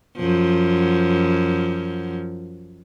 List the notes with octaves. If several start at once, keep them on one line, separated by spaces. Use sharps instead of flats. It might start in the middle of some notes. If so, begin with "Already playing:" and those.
F#2 F3